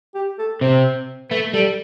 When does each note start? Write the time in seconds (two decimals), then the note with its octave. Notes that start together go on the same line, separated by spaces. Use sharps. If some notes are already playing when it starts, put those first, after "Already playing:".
0.15 G4
0.39 A4
0.61 C3 C5
1.30 A3 B4
1.54 G3 A4